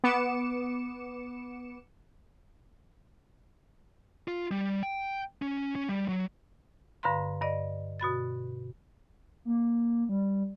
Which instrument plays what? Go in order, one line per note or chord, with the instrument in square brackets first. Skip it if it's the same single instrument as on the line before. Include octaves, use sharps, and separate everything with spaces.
[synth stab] B3 D6 C#7 E7
[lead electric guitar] F4
G3
G5
C#4
C#4
G3
F#3
[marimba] G2 D3 B4 F5 A#5 C6
G2 D5 D#5
B2 F#4 B5 A6
[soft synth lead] A#3
G3